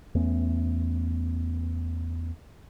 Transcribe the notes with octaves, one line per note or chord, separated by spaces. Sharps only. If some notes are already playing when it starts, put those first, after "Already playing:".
E2 A3 B3 C#4